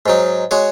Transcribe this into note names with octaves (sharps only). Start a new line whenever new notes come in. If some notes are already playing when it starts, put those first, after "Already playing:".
G#2 F#3 D#4
G#3 F#4 C#5